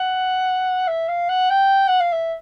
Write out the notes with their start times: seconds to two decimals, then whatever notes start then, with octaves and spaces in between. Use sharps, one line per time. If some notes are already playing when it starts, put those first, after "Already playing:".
Already playing: F#5
0.87 E5
1.09 F5
1.29 F#5
1.50 G5
1.88 F#5
2.00 F5
2.13 E5